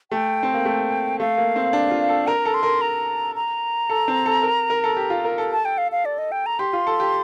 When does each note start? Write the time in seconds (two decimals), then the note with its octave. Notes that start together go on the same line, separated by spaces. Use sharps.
0.12 A3 G5
0.43 C4
0.54 A#3
0.65 A3
1.20 A3 F5
1.38 A#3
1.56 C4
1.73 D4
1.91 F4
2.09 A4
2.27 A#4 A#5
2.45 A4
2.54 C6
2.63 A#4
2.81 A#5
3.36 A#5
3.90 A4
4.08 C4
4.26 A4
4.43 A#4
4.70 A#4
4.84 A4
4.97 G4
5.10 F4
5.25 A#4
5.38 A4
5.52 A5
5.65 G5
5.78 F5
5.92 F5
6.05 D5
6.18 D#5
6.32 G5
6.46 A#5
6.59 G4 C6
6.73 F4
6.87 A4
7.00 G4